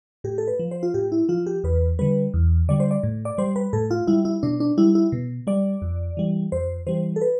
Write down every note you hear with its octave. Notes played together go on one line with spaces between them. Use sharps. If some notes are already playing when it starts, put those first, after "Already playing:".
A2 G4
A4
B4
F3
C5
F4
A2 G4
E4
F3 F4
G4
E2 B4
D3 G3 B4
E2
D3 G3 D5
C5
D5
A2
D5
G3 C5
B4
A2 A4
F4
G3 E4
E4
B2 D4
D4
G3 E4
E4
B2
G3 D5
F2
E3 G3
F2 C5
E3 G3 C5
A4
B4